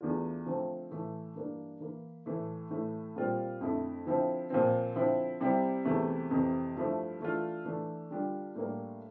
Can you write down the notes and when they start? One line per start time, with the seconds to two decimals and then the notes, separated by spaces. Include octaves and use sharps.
0.01 E2 E3 A3 D4 F4
0.46 D3 F3 A3 C4
0.91 A2 E3 A3
1.35 G2 E3 A#3 D4
1.80 E3 A#3 E4
2.26 A2 E3 A3
2.71 A2 E3 A3 E4
3.16 A#2 G3 C4 F4
3.61 F2 D3 A3 E4
4.05 D3 F3 C4 E4
4.50 A#2 F3 C4
4.96 D3 F3 C4 E4
5.40 C3 G3 C4 E4
5.85 E2 C3 E3 A3 E4
6.31 F2 C3 E3
6.76 G2 F3 A3 E4
7.20 E3 A3 D4 F4
7.65 E3 A3 D4
8.10 D3 G3 D4 F4
8.55 A2 G3 A#3 D4